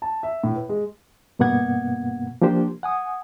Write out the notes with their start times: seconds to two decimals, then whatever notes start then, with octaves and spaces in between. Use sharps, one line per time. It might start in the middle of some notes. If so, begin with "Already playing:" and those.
0.02 A5
0.23 E5
0.44 A2
0.56 B4
0.69 G#3
1.39 G2 B2 A#3 B3 F#5 G#6
2.42 F3 A#3 D4 G4 C5
2.83 F#5 G#5 D#6